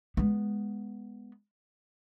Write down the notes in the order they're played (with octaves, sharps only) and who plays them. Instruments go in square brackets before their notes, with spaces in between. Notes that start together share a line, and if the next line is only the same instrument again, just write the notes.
[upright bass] G#3 B3